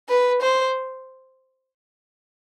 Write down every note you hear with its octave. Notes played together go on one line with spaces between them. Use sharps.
B4
C5